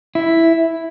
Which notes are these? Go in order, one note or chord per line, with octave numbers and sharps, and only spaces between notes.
E4